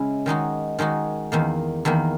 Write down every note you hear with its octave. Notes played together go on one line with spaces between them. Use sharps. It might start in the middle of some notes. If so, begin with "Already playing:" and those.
Already playing: C#3 G#3 C#4 E4
D#3 G#3 D#4 F#4
D#3 G#3 D#4 F#4
E2 D#3 A#3
E2 D#3 A#3